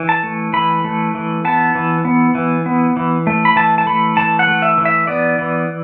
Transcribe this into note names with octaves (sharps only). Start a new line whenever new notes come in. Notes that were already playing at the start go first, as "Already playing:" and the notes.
Already playing: E3
A5
A3
E3 B5
A3
E3
B3 A5
E3
B3
E3
B3
E3
A3
B5
E3 A5
A5
A3 B5
E3 A5
F#5
A3
E5
E3
E5
B3 D5
E3